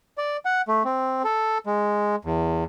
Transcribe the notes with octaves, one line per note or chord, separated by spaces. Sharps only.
D5
F#5
A3
C4
A4
G#3
E2